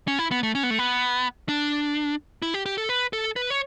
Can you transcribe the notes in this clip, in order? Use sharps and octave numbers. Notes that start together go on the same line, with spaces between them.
C#4
E4
B3
A3
C#4
B3
A3
B3
D4
E4
G4
G4
A4
B4
A4
B4
C#5